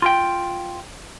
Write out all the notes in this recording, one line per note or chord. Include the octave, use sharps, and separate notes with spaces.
F4 G5